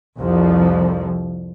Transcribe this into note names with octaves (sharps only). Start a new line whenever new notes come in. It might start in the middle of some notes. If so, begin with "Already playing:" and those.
C2 F2 F3